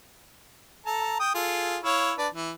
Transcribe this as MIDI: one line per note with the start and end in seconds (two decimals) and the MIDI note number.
0.86 1.17 69
0.86 1.17 81
0.86 1.17 82
1.20 1.31 79
1.20 1.31 87
1.34 1.78 65
1.34 1.78 68
1.34 1.78 69
1.83 2.13 64
1.83 2.13 73
1.83 2.13 77
2.18 2.28 62
2.18 2.28 71
2.18 2.28 74
2.34 2.52 52